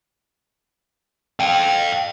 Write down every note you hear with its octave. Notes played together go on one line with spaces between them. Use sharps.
F5 G5